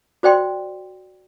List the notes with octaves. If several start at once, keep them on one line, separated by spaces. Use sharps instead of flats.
F#4 C5 D5 G5 C6